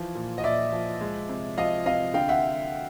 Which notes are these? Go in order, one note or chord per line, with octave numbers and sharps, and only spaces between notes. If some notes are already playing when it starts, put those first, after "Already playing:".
Already playing: E3 F3
A#2
D#5
A#2 D5 E5
F3
G#3
C3
F3 D#5 F5
C3 D#5 F5
D3 F5 G5
E5 F#5